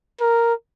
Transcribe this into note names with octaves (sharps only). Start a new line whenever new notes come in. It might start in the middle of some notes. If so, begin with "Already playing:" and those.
A#4